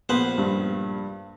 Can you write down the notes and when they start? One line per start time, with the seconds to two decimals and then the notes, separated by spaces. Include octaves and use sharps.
0.09 A#1 B3 B4 C5
0.38 G2